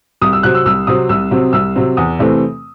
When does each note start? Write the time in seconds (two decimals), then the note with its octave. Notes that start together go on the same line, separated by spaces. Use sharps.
0.21 C2 D#6
0.33 E6
0.43 C3 F#3 C4 F#6
0.54 E6
0.66 C2 E6
0.87 C3 F#3 C4 D#6
1.09 C2 E6
1.31 C3 F#3 C4
1.53 C2 E6
1.75 C3 F#3 C4
1.97 E2 D#6
2.19 C3 E3 A3 C4